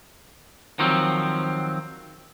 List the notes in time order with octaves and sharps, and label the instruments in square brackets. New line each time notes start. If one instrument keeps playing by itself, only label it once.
[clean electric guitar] D#3 F3 F#3 C4